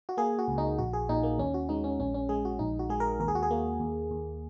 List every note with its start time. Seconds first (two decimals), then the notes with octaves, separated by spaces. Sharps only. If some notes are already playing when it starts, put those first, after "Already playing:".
0.09 F#4
0.17 A#3 G#4
0.39 F#4
0.48 C#2
0.58 D#4
0.78 A#1 F#4
0.93 G#4
1.09 A#2 D#4
1.23 A#3
1.38 D#2 C#4
1.54 F#4
1.69 G#3 D#4
1.84 C#4
1.99 A#1 C#4
2.14 C#4
2.29 G#3 G#4
2.45 F#4
2.59 A#1 D#4
2.79 F#4
2.89 G#3 G#4
3.00 A#4
3.20 D#2 A#4
3.28 G#4
3.35 F#4
3.43 G#4
3.51 A#3
3.80 D#2
4.11 D#2